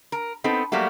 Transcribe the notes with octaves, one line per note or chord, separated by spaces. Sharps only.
A#4
B3 C4 D#4 A4
F#3 G3 A3 A#3 F#4